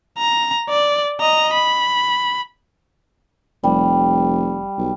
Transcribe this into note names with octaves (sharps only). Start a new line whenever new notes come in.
A#5
D5
D#5 A#5
B5
F1 G3
B1